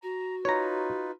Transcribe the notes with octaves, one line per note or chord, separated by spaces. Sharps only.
F#4 A#5
D#4 F4 B4 C#5 A#5